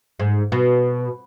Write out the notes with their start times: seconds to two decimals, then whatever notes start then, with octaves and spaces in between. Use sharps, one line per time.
0.20 G#2
0.52 B2